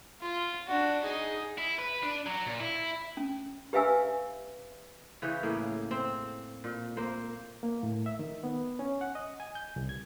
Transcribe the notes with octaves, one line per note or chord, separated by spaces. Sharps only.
F4
D4 F#4
D#4 G#4
E4
B4
D4
F#3
A#2
E4
C#4
G4 B4 E5 F5 G#5 E6
C#3 E3 C#4 G4
A2 A#3 G#4
C4
A#2
A#3 C5
A#3
A2
E5
D#3
B3
C#4
F#5
D#5
G#5
G6
C2
G#6